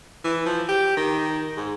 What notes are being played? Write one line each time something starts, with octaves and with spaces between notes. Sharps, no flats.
E3
F3
G4
D#3
G#2